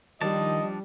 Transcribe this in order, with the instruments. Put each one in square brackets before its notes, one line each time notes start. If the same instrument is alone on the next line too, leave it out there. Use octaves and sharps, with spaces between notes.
[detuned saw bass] D#3 [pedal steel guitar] F3 D4 A5 [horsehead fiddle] G3 [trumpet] D#5